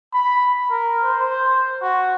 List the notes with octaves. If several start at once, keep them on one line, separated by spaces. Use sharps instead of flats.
B5
A#4
C5
F#4